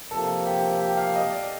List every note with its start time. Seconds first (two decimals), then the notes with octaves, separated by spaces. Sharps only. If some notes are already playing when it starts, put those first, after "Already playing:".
0.11 C3 F3 A#3 A4
0.46 G4
0.80 G4
0.97 F5
1.15 D#5
1.32 D5